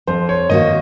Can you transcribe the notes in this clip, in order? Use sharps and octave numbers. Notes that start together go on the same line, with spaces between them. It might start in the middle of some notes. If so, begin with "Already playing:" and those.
F2 C5
C#5
D#3 A#3 D#4 F#4 D#5